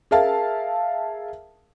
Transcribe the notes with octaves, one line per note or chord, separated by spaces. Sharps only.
G#4 A#4 E5 F5 A5